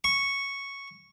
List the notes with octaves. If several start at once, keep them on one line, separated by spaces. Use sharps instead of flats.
C#6